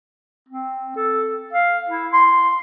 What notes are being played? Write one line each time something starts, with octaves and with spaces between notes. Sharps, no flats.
C4
A4
F5
E4
C6